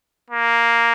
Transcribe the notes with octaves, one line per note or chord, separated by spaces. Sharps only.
A#3